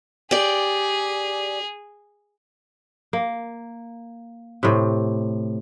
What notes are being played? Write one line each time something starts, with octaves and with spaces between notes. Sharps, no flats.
G4 G#4 D5
A#3
A2 C3